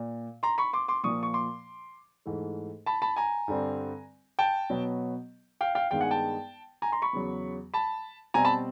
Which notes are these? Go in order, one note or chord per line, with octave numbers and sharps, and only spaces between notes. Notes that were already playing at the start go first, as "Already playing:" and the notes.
Already playing: A#2
A#5 C6
B5 C#6
C6 D6
C6 D6
A#2 F3 A#3 C#6 D#6
C#6
C6 D6
G#2 E3 A3
A5 B5
A5 B5
G#5 A#5
G2 D3 G3 C4
G5 A5
B2 F#3 B3
F5 G5
F5 G5
G2 D#3 G#3 B3 F5 G5
F#5 G#5
G5 A5
G#5 A#5
A#5 C6
B5 C#6
E2 C#3 F#3
A5 B5
B2 G3 C4 G#5 A#5
A5 B5